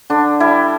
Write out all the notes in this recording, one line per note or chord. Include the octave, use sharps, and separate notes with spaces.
D3 D4
G3 E4